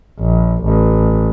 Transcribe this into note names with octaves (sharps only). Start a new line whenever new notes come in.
A#1
A1